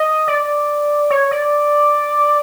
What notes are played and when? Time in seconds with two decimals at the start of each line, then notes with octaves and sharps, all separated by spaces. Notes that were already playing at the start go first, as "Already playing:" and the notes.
Already playing: D#5
0.28 D5
1.10 C#5
1.31 D5